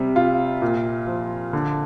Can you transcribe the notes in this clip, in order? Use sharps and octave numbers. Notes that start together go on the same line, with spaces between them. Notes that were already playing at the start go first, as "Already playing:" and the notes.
Already playing: C3 G3
F4
A#2
F3
D3